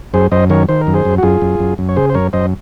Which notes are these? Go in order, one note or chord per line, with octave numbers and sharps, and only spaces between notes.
F#2 G#4 C5
F#2 C5 D#5
D#3 A#4 C#5
D#3 C5
A#4
F#2
G#4 C5
F#2
F#4
F#2 F4 G#4
F#2
F#2
F#2
C#5
C#3 G#4 C5
C5
F#2 A#4 C#5
F#2 C5 D#5